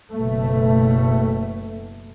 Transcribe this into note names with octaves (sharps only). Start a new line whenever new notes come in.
F#1 B2 A3